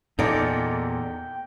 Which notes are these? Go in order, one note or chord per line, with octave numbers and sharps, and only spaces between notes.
E2 A#2 D#4 A4 D5 G5